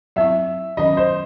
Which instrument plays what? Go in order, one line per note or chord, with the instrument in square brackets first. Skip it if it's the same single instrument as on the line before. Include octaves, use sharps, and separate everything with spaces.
[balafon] F#3 C4 E4 [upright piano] E5
[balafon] D#3 F#3 C#4 [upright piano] D#5
[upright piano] C5